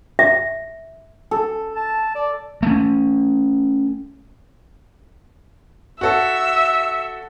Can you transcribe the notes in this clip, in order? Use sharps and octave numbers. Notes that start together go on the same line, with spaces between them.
E5
A4
A5
D5
A3 C#4
F#4 A4 E5